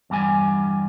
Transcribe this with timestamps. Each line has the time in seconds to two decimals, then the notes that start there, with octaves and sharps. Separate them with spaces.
0.10 E2 G2 G3 G#5